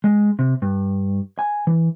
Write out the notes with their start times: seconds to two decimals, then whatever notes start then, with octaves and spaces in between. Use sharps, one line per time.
0.04 G#3
0.39 C3
0.62 G2
1.39 G#5
1.67 E3